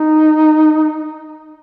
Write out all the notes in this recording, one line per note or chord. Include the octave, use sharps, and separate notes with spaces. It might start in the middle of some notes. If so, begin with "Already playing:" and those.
Already playing: D#4